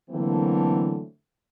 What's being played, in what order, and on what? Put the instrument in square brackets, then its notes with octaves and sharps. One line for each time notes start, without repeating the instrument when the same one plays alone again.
[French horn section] D3 E3 F#3 A3 A#3 C4